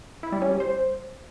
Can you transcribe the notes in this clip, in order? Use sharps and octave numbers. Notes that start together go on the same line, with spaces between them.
E4
G3
C#4
G3
C5